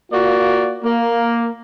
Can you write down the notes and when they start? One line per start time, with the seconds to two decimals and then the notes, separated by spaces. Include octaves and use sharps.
0.12 A#3 F4 F#4 D5
0.84 A#3